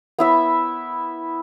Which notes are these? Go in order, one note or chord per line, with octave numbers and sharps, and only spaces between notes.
B3 E4 E5